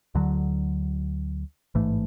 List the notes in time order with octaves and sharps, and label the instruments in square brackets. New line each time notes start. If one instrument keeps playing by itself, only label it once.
[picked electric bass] D2 D3 F#3
A1 G#2 E3 A3